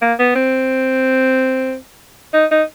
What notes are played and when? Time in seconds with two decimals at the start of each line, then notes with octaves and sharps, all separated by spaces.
0.02 A#3
0.19 B3
0.35 C4
2.34 D#4
2.51 D#4